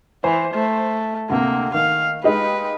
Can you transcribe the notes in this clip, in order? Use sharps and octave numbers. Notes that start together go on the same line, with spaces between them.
E3 C5
A3
D2 C3 A#3
D#3 F5
G#3 D#4 G4 B4